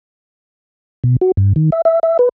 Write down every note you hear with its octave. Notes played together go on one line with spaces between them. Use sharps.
B2
F#4
G2
D#3
E5
E5
E5
B4